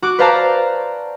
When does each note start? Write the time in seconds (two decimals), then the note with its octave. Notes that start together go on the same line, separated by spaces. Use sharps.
0.02 F#4 D6 F#6
0.19 B4 C5 D5 F5 A5 A#5